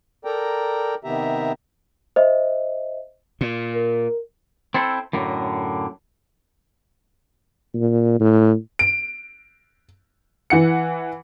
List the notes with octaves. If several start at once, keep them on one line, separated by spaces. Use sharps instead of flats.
A4 A#4 D5 G5 A#5
C3 D#3 B3 G4 E5 A#5
C5 D#5 E5
A#2
A#4
C4 E4 A4 C5
F#2 A2 D3
A#2
A2
D7
E3 F#5 C#7